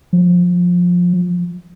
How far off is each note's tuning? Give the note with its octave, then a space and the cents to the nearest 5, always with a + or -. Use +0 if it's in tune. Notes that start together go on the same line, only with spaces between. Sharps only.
F3 +20